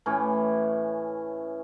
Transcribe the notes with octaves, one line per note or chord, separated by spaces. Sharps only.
A2 E3 C#4